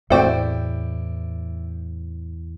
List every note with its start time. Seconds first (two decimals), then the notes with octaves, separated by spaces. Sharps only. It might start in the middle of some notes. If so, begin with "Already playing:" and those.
0.10 E2 A2 A3 C4 E4 F#4 D5 G5